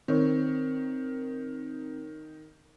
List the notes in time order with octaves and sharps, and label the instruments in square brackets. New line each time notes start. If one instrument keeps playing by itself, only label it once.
[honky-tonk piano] D#3 [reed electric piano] C4 C#5